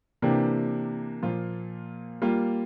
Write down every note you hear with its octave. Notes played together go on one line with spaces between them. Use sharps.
C3 E3 A#3 D4 G4
A#2 F3 A#3 F4
G3 A#3 F4